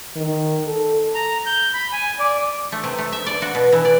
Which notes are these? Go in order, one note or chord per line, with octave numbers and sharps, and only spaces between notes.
D#3
A4
A#5
G6
B5
G#5
D5
A3
C3
A3
E5
D5
F#4
B2
E3
D5